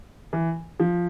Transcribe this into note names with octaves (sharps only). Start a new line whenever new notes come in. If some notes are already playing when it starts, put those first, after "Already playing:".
E3
F3